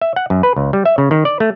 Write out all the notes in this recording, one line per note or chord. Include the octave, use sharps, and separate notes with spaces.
E5
F#5
F#2
B4
C#2
G3
E5
C#3
D#3
D5
A3